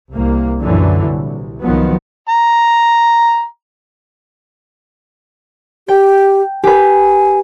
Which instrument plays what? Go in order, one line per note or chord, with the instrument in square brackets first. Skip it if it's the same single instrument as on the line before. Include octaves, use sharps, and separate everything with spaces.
[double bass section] C2 A#3
F#2 A#2 D3 E3 F#3
C2
C2 D#3 F3 F#3 B3
[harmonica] A#5
[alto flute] G4 [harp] G5
[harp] G4 B4 [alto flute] G#5